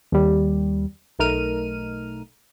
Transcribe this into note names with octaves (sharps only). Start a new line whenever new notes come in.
D#2 G3
B1 A3 D#4 A#4 F6 D#7